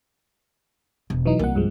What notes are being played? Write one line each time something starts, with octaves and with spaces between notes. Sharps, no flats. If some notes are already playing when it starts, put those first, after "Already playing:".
E1
E3 F#3 D#4
C2 A#3 E4 F#5
G2 F3 G#3